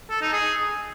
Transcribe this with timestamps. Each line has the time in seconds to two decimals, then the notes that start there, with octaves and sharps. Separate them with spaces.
0.10 A4
0.21 D#4
0.33 G#4